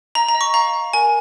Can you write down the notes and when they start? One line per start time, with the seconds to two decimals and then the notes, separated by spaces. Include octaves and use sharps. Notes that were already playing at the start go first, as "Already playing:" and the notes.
0.15 D#5 A#5
0.29 A#5
0.35 D#5
0.41 C#6
0.54 F5 A#5
0.74 F5
0.93 A#4 G#5